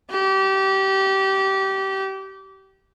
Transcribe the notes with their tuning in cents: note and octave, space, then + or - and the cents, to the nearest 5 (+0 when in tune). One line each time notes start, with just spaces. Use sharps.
G4 -25